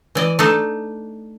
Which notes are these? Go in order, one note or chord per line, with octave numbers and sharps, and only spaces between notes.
E3 D5 D#5
A3 D4 D#4 A5